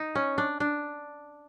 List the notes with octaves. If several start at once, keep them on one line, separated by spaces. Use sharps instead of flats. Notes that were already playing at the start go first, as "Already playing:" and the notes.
Already playing: D#4
C#4
D4
D4